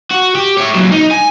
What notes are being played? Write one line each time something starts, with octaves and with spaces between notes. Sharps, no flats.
F#4
G4
E4 C#5
A#2 F#3
D#4
G#5